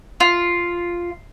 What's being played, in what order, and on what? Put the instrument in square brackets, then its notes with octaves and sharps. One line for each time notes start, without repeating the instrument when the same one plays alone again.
[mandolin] F4